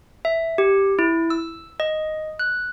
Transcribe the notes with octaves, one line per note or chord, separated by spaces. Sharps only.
E5
G4
E4
E6
D#5
F#6